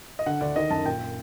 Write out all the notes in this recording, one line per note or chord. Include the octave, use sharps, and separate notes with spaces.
D#5
D3 F#5
D2 D5
D#3 D#5
F#2 A5
A#2 G5